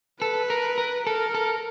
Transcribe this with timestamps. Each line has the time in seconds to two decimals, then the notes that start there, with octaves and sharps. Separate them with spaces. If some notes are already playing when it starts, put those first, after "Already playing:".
0.21 A4 B4
0.50 A#4
0.78 A#4
1.06 A4 A#4
1.35 A4